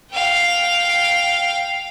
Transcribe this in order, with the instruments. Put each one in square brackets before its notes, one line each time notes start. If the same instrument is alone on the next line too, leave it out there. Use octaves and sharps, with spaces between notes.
[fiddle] F5 G5